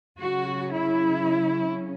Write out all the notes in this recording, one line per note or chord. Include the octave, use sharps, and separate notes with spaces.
C#3 F#3 C#4 F#4
E4